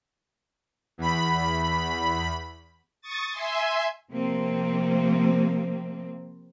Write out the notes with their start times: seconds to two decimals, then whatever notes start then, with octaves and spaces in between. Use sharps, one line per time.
0.98 E2 B5
3.02 C#6 D#6 A6
3.31 E5 G#5 C6
4.10 C3 F3 A#3 C4